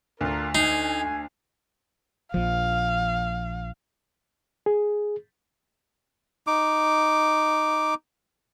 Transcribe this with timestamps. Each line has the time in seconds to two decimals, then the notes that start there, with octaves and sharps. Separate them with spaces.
0.21 D2 D4 F4 A#4
0.55 D#4 G#5 C7
2.34 A#1 F3 F5
4.66 G#4
6.47 D#4 D6